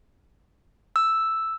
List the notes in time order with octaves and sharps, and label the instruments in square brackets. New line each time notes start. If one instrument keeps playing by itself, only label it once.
[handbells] E6